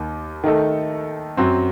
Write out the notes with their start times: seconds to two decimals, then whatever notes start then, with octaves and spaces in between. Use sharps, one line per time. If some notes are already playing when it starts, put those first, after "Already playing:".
Already playing: D#2 D#3
0.44 D#3 A3 D#4 A4
1.37 F#2 F#3 C4